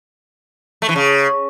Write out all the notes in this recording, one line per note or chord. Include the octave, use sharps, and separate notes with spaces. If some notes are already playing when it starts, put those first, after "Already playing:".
A3
E3
C#3